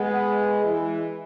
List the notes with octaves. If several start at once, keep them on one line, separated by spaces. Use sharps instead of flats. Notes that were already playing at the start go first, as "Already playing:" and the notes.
Already playing: G#3 B3
E3 G#3